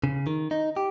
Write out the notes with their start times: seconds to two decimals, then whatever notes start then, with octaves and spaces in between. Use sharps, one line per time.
0.04 C#3
0.27 D#3
0.51 D#4
0.77 G4